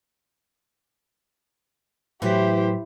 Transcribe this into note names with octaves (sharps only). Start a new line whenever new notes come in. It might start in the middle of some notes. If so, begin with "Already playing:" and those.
A2 E3 F#3 G4 C5 B6